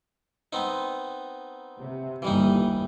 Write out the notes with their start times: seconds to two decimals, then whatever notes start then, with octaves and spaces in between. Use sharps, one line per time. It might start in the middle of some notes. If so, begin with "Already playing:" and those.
0.53 B3 C4 D#4
1.80 C3
2.22 G1 D#2 E3 G3 D#4